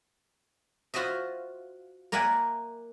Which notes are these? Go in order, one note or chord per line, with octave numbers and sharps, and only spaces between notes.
F4 F#4 C5 D#5 E5
A#3 A#4 D5 E5 F#5 G#5